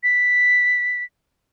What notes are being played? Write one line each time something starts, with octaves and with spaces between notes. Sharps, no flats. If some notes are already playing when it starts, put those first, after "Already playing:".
B6